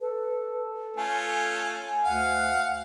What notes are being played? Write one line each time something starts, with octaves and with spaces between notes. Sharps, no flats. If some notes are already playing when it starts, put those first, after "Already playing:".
A4 B4
A3 C#4 F4 G#5
D2 F5 F#5